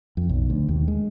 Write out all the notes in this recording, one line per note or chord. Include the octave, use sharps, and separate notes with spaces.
F2
B1
D2
D#2
G#3